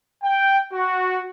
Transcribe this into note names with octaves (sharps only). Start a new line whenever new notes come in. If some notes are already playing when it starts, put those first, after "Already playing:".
G5
F#4